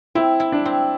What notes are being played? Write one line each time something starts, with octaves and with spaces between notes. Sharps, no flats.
C4 E4
E4
D4
C4